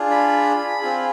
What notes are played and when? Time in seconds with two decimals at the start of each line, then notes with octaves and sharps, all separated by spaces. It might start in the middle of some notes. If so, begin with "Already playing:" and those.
Already playing: D4 F4 G#4
0.11 B5
0.81 C4 F4 G#4